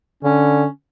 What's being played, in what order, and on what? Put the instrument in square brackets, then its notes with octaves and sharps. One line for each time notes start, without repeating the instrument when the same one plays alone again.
[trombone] D3 [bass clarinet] C#4